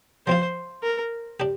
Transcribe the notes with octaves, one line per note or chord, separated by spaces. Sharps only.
F3 C4 F4 C5
A#4
D4 G4